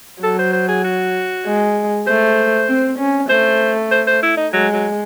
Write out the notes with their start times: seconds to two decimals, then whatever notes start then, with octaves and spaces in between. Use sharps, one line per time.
0.23 F#3 A4
0.39 C5
0.53 C5
0.68 G#4
0.84 F#4
1.46 G#3
2.07 A3 C5
2.68 C4
2.99 C#4
3.29 A3 C5
3.91 C5
4.07 C5
4.22 E4
4.37 D#4
4.53 F#3 G#3
4.73 F#3